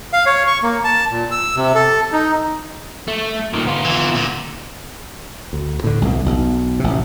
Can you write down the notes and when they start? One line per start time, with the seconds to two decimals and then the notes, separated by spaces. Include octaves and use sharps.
0.13 F5
0.26 C#5
0.47 C#6
0.63 A#3
0.84 A5
1.10 A#2
1.31 E6
1.56 C3
1.75 A4
2.13 D#4
3.08 A3
3.53 A#2 D#3
3.67 B3 F4
3.85 E3
4.16 A#2 D3
5.53 D2
5.84 A2 D3
6.02 C2 B2
6.26 B1
6.80 A1 C3